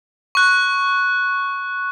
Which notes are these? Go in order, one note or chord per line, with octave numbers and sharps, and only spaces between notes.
C#6 F#6